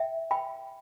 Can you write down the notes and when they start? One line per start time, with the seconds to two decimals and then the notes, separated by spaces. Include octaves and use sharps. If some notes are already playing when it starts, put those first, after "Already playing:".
Already playing: E5 G5
0.31 B4 G5 B5